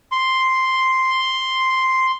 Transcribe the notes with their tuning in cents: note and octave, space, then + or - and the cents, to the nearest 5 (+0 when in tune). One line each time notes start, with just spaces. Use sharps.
C6 +0